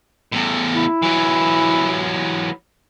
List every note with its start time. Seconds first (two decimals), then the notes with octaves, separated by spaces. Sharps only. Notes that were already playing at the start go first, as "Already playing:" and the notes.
0.32 E2 A2
0.74 E4
1.02 E3 F#3